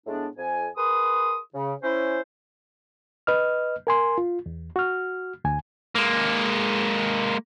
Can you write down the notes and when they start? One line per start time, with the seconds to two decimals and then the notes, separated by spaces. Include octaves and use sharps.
0.07 A2 G#3 A3 B3 D4
0.37 F2 G#5
0.77 G#4 A#4 B4 C6 D#6
1.54 C#3
1.83 C#4 E4 C5
3.27 B4 D#5 F6
3.87 A#4 G#5 C6
4.18 F4
4.46 E2
4.76 F#4 F6
5.44 D2 G#5
5.95 G#3 A#3